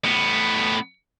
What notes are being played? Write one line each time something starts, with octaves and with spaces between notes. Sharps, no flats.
A2 B3